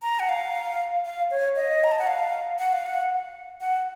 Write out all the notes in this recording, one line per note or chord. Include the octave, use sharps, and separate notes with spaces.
A#5
F#5
F5
F5
C#5
D#5
A#5
A5
F#5
F5
F#5
F5
F#5
F#5